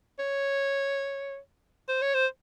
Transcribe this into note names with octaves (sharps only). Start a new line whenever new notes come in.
C#5
C5
C#5
C5